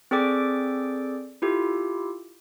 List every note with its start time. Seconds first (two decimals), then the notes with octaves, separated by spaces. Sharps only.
0.11 C4 G#4 A4 D5 G5 D6
1.42 E4 F4 G4 A4